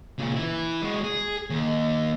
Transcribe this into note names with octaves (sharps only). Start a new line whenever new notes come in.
A#2 C#3
E3 E4
G#3 F#4
G#4
D#2